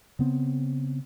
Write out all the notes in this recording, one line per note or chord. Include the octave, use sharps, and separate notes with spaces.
C#3 B3 C4